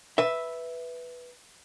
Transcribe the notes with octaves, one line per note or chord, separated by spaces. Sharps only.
B4 E5